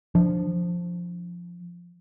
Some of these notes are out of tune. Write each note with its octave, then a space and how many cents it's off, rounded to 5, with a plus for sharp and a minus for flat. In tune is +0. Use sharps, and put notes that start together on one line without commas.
F3 +0 D4 +0